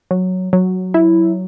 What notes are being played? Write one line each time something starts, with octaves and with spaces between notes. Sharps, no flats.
F#3
F#3
E4